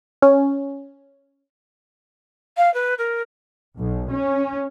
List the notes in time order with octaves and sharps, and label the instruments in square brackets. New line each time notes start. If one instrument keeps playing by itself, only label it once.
[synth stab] C#4
[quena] F5
B4
A#4
[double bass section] B1
C#4